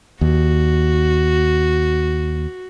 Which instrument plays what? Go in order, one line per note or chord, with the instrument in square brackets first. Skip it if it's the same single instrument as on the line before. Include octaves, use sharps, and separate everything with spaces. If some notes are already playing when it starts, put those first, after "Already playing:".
[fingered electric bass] D#2 [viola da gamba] F#4